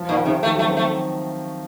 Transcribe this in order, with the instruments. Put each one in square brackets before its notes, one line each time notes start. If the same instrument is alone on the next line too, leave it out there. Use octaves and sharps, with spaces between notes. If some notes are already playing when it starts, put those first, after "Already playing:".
Already playing: [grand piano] F3
[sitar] A#2 [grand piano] D#3
[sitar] C3 [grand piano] D#3
[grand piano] D#3 [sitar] A3
[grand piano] F#3 [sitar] A3
[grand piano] C4
[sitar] A3